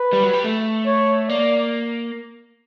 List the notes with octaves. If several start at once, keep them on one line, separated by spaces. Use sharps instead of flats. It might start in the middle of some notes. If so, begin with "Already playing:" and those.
Already playing: B4
G3
F#3
G3
A3
C#5
A#3 D5